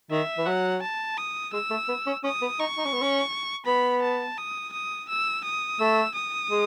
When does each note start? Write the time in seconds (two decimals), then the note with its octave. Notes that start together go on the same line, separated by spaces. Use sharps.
0.11 D#3 E5
0.38 E3
0.46 F#3 F#5
0.82 A5
1.18 D#6
1.53 G#3 E6
1.70 A3
1.88 B3
2.07 C#4
2.24 C#4 D#6
2.41 B3
2.60 D#4 C#6
2.78 D#4
2.85 C#4
2.93 B3
3.01 C#4
3.66 B3 B5
4.03 A5
4.38 D#6
4.73 D#6
5.09 E6
5.44 D#6
5.79 A3 E6
6.15 D#6
6.50 G#3